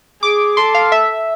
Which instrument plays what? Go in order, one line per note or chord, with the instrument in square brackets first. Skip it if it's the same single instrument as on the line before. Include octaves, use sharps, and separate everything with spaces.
[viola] G#4 [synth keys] D6
[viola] A4 [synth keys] C6
[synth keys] F5
E5